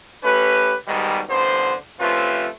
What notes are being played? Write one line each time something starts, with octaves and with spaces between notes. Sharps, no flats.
A3 C#4 G4 B4
G#2 B2 D#3 G3
A1 G2 D3 B3 C5
C3 F3 A3 C#4 F4 B4